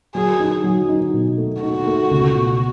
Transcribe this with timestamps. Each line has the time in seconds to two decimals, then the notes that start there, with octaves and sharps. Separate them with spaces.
0.15 F#3 G#4
0.40 D#4
0.64 F#3
0.89 D#4
1.13 B2
1.37 A3
1.62 D#4 F#4
1.86 A3
2.11 C#2
2.35 B2